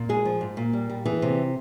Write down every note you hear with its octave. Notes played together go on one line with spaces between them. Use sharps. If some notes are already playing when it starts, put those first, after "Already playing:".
Already playing: A#2
G#3 G#4
F3
G#2
A#2
G3
G3
E3 G#4
C3